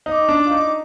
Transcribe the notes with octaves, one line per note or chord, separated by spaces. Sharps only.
D#4 D6 D#6
D4
F4
D#4